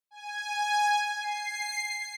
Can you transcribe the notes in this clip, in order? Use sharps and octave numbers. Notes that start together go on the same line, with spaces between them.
G#5
C7